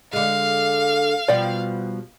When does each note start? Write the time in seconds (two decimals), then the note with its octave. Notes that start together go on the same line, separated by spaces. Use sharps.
0.13 D3 G#3 F5
1.28 B2 F3 G3 D5 G5